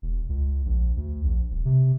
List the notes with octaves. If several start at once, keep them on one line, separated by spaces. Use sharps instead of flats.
E1
C#2
A#1
D2
A#1
D#1
C3